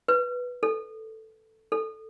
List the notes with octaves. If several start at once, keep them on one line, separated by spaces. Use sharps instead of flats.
B4
A4
A4